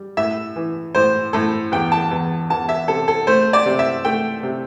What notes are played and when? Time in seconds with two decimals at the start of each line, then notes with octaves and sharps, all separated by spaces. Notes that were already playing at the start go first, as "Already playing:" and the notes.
Already playing: G3
0.17 A2 E5
0.56 E3
0.95 A2 C5
1.33 A2 A4
1.72 E2 G5
1.92 A5
2.11 E2
2.50 E2 A5
2.69 E5
2.88 C3 A4
3.08 A4
3.27 A3 C5
3.53 D5
3.66 C3
3.79 E5
4.05 A3 G5
4.43 C3